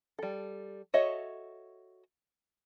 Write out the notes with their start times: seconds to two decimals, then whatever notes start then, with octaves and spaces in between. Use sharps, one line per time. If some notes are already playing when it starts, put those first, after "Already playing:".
0.19 G3 A4
0.94 F#4 A4 C#5 D#5 E5